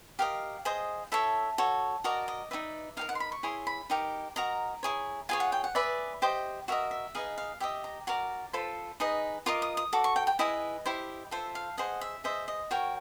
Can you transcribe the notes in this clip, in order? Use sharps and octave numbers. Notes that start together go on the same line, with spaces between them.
G4 A#4 D#5 F5
G#4 C5 D#5
E4 A4 C#5 E5
F#4 A4 C#5
F#4 A#4 D5 D#5
D#5
D#4 F#4 B4 D5 E5
D#4 G4 A#4 F5
F#5
C6
B5
C#6
E4 G#4 C#5 C6
B5
D#4 G4 A#4
F#4 A#4 D#5 A#5
E4 G#4 C#5
F4 G#4 C#5 G#5
F#5
G5
F#5
G#4 B4 D5 E5
G4 C5 D#5
F#4 A#4 D#5 E5
E5
D#4 G#4 B4 D#5 F5
F5
G4 B4 D#5 E5
A#5
F#4 A#4 D5 A#5
F4 A4 C5 B5
D#4 G#4 B4 D#5
F4 A#4 D#5 D6
D#6
D#6
F#4 A4 D6
C#6
G5
G5
E4 G#4 B4 D#5
E4 G4 C5
F4 A4 C5 E5
F5
G#4 C5 D#5 F#5
E5
G#4 C5 D#5 E5
D#5
F#4 A#4 C#5 G5